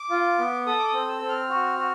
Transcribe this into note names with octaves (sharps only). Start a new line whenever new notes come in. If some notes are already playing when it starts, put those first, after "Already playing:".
Already playing: D6
F4
B3
A4 D#6
D6
D#6
C4
E6
C4
F6
F#4
F#4